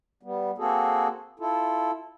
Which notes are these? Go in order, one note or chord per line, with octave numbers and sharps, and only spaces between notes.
G3 B3
A#3 C4 F#4 G#4 A4
E4 F4 A4